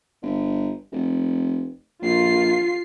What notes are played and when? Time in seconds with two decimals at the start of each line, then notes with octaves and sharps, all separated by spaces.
0.22 G1
0.92 F1
2.02 A#1 F4 C7